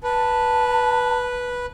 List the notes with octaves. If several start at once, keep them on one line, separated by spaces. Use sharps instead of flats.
B4 A5